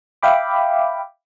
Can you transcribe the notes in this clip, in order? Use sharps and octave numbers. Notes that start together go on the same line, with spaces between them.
E5 F5 G5 B5 D6